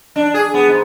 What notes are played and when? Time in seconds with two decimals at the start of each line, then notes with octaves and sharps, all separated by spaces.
0.16 D4
0.34 G#4
0.54 B3
0.68 G#2